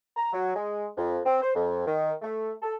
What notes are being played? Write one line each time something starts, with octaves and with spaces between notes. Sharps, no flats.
A#5
F#3
G#3
F2
C4
C5
F2
D#3
A3
A4